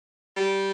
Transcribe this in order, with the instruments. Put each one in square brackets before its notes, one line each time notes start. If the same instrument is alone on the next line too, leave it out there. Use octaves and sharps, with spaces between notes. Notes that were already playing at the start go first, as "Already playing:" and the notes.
[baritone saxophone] G3